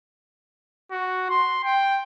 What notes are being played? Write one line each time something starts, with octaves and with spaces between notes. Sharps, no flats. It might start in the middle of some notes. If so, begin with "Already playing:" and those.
F#4
C6
G5